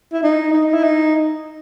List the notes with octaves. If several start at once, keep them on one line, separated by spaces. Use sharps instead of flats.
E4
D#4
D#4
E4
D#4